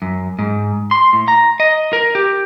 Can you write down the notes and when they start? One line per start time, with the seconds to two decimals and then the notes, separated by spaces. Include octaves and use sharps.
0.02 F#2
0.39 G#2
0.91 C6
1.13 A2
1.28 A#5
1.60 D#5
1.93 A#4
2.15 G4